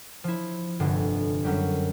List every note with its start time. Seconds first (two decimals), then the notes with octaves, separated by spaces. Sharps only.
0.24 F3 E4
0.80 F1 G2 D3
1.44 F#2 F#3 G3